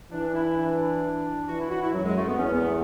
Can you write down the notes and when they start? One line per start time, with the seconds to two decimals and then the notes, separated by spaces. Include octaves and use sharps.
0.11 E3 D4
0.34 E4
0.57 D4
1.48 E3 F#4
1.59 E4
1.70 F#4
1.82 E4
1.93 F#2 F#3
2.04 G#3
2.16 A3
2.27 B3
2.38 E2 C#4
2.53 B3
2.68 A3